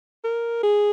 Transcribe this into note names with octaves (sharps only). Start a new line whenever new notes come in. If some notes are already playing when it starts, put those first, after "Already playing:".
A#4
G#4